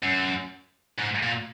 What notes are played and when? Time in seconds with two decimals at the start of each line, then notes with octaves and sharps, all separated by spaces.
0.03 F#2
0.99 G#2
1.23 A#2